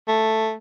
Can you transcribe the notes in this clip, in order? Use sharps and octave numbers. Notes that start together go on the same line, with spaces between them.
A3